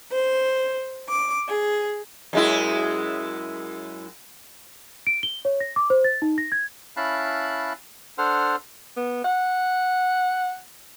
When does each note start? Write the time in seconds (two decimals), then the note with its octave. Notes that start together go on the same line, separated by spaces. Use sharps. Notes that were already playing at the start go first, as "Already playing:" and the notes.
0.11 C5
1.08 D6
1.47 G#4
2.33 F#2 G#3 E4
5.07 D7
5.23 G7
5.45 C#5
5.60 A#6
5.76 D6
5.90 C5
6.04 A6
6.22 D#4
6.38 A#6
6.52 G#6
6.97 C#4 E4 F5 A5 B5 F#6
8.18 D4 A4 C5 F#5 C6 F6
8.96 B3
9.25 F#5